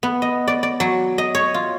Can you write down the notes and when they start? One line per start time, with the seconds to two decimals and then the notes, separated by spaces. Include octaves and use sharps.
0.03 B3
0.22 D#5
0.48 D5
0.63 D5
0.80 F#3
1.18 D#5
1.35 C#5
1.54 F4